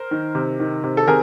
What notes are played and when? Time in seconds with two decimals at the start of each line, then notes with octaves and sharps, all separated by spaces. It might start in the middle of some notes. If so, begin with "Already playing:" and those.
Already playing: A#4 C5
0.11 D#3
0.35 C3
0.60 D#3
0.84 C3
0.97 A4
1.08 C3 G#4 A#4